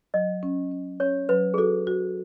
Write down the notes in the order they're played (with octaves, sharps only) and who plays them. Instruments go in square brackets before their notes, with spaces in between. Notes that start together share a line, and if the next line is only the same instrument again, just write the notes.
[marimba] F#3 [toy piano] D#5
[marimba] C#4
C#4
[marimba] C#4 [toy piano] C#5
[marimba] F#3 [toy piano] B4
[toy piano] G#4
[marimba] F#4 [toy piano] A4
[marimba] F#4